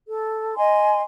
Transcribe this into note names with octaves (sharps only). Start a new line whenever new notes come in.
A4
D#5 G#5 C6